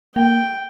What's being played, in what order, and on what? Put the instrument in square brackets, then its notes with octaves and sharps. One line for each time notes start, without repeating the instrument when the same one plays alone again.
[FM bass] A#3 [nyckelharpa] G5